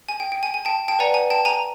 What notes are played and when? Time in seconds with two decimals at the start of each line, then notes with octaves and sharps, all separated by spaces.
0.09 G#5
0.20 G5
0.32 G5
0.43 G#5
0.54 G#5
0.65 G5 A5
0.88 G5 A5
0.99 B4 D5 F#5 G#5 A#5
1.14 G#5
1.30 G5 A5
1.45 G#5 A#5